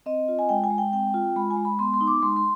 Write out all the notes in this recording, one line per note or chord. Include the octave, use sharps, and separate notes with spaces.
C4 D#5
F4
G#5
G#3 G5
G#5
G#3
G5
C4 G5
F4
G#3 B5
G#5
G#3
B5
B3 C6
C6
D#4
D6
G#3 C6
C6